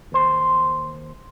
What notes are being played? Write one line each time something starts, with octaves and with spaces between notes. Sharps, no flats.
D#2 C5